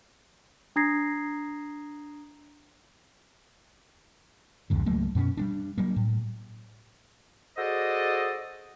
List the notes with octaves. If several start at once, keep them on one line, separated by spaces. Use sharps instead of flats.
D4 A#5 D#6 G#6 A#6 C7
C2 F2 G#2 D3
C#2 F#3 A3 A#3
F#2 B2 C4 C#4
G3 B3 D4
F#3 G3 A#3
A2
F#4 G#4 A4 C5 D5 D#5